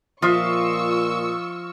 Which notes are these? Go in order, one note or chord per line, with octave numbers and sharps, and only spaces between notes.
A#2 F3 F4 D#5 E5 C#6 E6